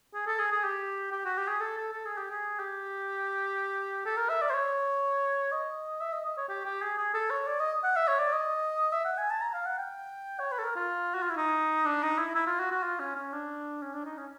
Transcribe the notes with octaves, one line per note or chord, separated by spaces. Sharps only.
G#4
A4
G#4
G#4
G4
G4
F#4
G4
G#4
A4
A4
A4
G#4
G4
G#4
G4
A4
A#4
E5
D5
C5
C#5
D#5
E5
D#5
D#5
C#5
G4
G4
G#4
G#4
A4
C#5
D5
D#5
F#5
E5
C#5
D5
D#5
E5
F#5
G#5
A5
A#5
F5
F#5
G5
C#5
B4
A4
A#4
F4
F#4
F4
E4
D#4
D4
D#4
E4
E4
F4
F#4
F#4
F4
C#4
C#4
D4
C#4
D4
D#4
C#4